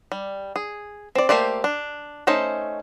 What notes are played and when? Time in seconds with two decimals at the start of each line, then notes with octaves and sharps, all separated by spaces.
0.12 G3
0.56 G#4
1.15 C4 D5
1.29 A3 A#3 G4 C5 D5
1.64 D4
2.27 A3 C#4 D#4 C5